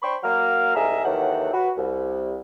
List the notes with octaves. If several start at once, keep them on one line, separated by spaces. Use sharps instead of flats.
D4 C5 G5 B5 C#6
F#3 A#3 F6
C2 G#2 G#4 D#5 E5 A#5
D#2 E3 F#3 A4 F#5 G5
F#4 B4
C2